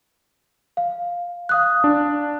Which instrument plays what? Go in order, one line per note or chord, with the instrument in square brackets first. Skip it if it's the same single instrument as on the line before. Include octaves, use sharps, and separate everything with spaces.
[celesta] F5
F5 D#6 F#6
[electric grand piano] D4